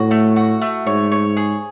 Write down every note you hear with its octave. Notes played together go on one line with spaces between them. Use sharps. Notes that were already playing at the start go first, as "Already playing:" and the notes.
Already playing: A2 F#4
A3
F#4
A3
G#2 C#5
C#5
G#4